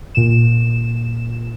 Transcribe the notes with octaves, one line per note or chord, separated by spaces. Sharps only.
A#2 E7